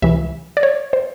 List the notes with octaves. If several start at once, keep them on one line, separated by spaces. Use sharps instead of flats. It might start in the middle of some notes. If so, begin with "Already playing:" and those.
C#2 C3 E3 E5
D5
C#5
C5